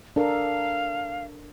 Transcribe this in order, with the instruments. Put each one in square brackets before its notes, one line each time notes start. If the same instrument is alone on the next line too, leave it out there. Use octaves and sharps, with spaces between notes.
[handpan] D4 A4 A#4 [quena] F5